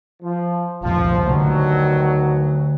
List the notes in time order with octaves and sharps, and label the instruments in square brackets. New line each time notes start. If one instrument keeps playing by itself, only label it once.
[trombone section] F3
[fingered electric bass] F1 C2 A#2 [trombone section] F3
[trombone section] G2 D#3 F#3 [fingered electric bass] D3 A3